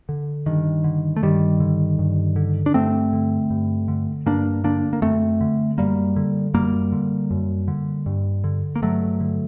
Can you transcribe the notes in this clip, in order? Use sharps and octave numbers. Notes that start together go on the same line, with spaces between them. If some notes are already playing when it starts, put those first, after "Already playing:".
D3
G2 D#3
D3
A3
G2 D#3 G3
D3
G2
D3
D4
G2 A3 C4
D3
G2
D3
G2 A#3 D4
D3 A#3 D4
A#3
F#2 A3 C4
D3
F#2 G3 A#3
D3
F#2 G3 A#3
D3
F#2
D3
G2
D3
A#3
G2 F#3 A3
D3